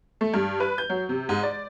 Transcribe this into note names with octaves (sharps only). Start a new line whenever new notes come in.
A3
G2
B4
G6
F#3
C3
G#2
D5